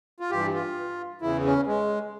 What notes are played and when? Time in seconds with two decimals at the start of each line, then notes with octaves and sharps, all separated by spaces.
0.20 F4
0.31 G2 E3 G4
0.54 F4
1.21 E2 C#3 E3 E4
1.45 C#4
1.67 G#3